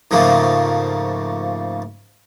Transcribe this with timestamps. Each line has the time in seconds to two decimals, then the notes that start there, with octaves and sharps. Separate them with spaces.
0.11 G#2 C#3 F3 A3 A#3